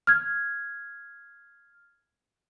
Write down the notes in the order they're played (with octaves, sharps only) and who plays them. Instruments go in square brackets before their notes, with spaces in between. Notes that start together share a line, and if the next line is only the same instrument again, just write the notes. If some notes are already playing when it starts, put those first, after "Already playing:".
[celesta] F6 G#6